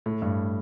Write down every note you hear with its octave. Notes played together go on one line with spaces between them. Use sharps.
A2
G2